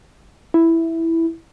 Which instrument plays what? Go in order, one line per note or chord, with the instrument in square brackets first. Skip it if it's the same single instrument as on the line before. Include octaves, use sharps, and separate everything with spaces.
[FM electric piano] E4